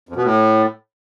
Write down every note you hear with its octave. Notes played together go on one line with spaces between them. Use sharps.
F2
B2
A2